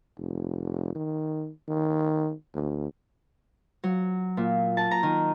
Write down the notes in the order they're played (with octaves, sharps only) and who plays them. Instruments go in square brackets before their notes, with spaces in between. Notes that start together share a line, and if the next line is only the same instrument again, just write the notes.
[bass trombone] F1
D#3
D#3
D2
[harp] F#3
A#2
A5
A#5
D#3